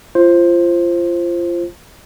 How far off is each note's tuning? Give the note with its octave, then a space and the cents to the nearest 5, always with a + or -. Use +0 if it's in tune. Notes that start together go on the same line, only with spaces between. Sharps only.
F4 -25 C5 +10